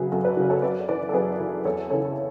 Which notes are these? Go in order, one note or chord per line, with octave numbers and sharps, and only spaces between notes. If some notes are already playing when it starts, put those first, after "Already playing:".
Already playing: F#2 C#3 F#3 G#4 B4
F#2 F#4 A4
B4 D5
C#3 F#3
A4 C#5
F#2 B4 D5
E3 B4 D5
A4
F#2 G#4 B4
E3
E2 A4 C#5
C#3 E3 A4 C#5